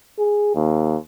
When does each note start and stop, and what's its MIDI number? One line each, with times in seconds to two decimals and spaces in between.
0.18 0.50 68
0.55 0.96 39